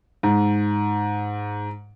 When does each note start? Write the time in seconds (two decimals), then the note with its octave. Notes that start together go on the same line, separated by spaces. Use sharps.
0.23 G#2